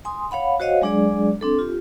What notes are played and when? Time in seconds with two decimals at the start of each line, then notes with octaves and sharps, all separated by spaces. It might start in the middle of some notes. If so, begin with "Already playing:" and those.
0.05 G#5 C6 D#6
0.31 C#5 F5 F#5 B5
0.60 F#4 C5 C#5 D#5 F5 F#5
0.82 F#3 G#3 D4 G#4 D5
1.41 C4 D4 A4
1.59 F4 G4